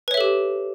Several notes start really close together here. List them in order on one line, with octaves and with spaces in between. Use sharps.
B4 C#5 E5 A4 G4